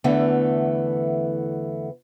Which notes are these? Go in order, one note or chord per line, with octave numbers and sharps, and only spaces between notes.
E2 D3 E3 A3 B3